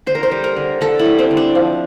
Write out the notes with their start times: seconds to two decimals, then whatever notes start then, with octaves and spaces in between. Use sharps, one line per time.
0.07 D3 C5
0.15 A#4
0.23 C5
0.31 G3
0.44 A#4
0.56 D3
0.81 D3 A4
0.99 E4
1.05 G3
1.19 C4
1.31 D3
1.37 D4
1.55 F3